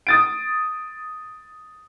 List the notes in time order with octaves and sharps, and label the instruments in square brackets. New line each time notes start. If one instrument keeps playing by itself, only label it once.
[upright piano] D#6 A6 D7